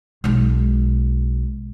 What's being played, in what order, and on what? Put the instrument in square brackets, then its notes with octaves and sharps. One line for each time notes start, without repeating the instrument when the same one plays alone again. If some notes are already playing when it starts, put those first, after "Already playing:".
[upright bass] B1 G#3